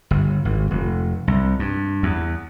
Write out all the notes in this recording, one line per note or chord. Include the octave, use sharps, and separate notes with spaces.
G1
G#1
F1
C2
G2
E2